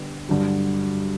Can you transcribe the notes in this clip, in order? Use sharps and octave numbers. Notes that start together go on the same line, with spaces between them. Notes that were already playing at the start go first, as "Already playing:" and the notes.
Already playing: D3 G3 B3
G2 D3 F#3